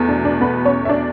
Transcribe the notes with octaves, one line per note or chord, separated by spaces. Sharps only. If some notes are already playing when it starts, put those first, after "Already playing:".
Already playing: E2 B2 A3
D4
D4
B3 B4
C#4 C#5
E5
D4 D5